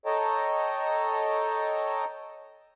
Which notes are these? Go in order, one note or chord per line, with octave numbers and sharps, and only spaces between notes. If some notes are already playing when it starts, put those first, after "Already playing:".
A4 C#5 D#5 G5 A5 A#5